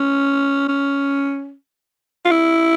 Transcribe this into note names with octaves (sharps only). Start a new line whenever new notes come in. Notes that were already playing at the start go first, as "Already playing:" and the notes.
Already playing: C#4
C#4
F4
E4